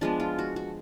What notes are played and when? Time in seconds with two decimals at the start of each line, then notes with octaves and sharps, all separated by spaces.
0.01 F3 G#3 B3 D4
0.20 F4
0.39 F#4
0.56 F#4